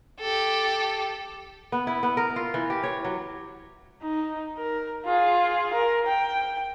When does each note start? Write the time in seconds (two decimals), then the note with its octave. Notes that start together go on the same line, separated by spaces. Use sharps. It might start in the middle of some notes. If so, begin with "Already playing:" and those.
0.20 G4 A4
1.72 B3
1.87 E4
2.03 B3
2.17 A#4
2.36 F4
2.54 E3
2.70 G4
2.83 C#5
3.05 F#3
4.03 D#4
4.57 A#4
5.05 F4 G#4
5.73 A#4
6.06 G5